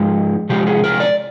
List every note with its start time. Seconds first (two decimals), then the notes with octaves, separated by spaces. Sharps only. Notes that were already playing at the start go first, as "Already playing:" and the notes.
Already playing: G#2 F3 G#3 D#4
0.49 C3 F3 G#3 G4
0.67 G#4
0.84 A#4
1.00 D5